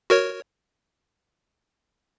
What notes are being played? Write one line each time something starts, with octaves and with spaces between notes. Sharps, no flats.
F#4 A#4 C#5